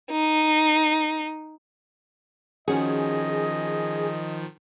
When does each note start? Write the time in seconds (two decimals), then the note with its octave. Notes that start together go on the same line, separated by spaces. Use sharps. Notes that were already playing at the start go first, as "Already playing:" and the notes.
0.11 D#4
2.68 D#3 F3 C#4 F#4 G#4 D#5